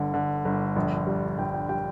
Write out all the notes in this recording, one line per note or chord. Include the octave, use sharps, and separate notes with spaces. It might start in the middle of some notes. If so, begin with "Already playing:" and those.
Already playing: G1 D3
D3
G1
A#1
G3
A#1 G5
G5
G3 G5